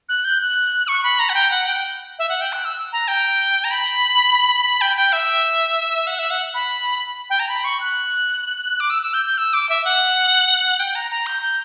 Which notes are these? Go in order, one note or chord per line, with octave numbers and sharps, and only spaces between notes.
F#6
G6
F#6
C#6
B5
A#5
F#5
G5
F#5
G5
E5
F#5
G5
F#6
E6
A#5
G5
A#5
B5
B5
G5
G5
E5
F#5
E5
F#5
B5
G5
A#5
B5
C#6
F#6
D6
E6
E6
G6
G6
E6
D6
E5
F#5
G5
A#5
A#5
G6
G6